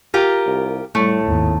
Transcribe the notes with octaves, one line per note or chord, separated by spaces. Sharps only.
F4 G4 A#4
C2
A2 G3 A3
G#1 D#2